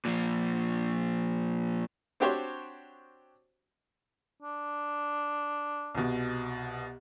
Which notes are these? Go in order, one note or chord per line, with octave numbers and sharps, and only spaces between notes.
A#2 F3
C4 D4 F#4 G4 C5 C#5
D4
C2 B2